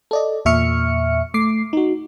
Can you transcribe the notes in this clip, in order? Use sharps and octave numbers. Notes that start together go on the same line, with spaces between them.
A4 D5 D#5
E2 A#2 E5 C#6 F6 C#7
A3 D6 C7
D#4 F#4